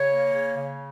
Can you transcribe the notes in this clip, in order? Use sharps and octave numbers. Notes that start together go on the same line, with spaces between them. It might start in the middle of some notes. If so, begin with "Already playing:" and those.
Already playing: C#3 C#5
A#3
C#3
C#3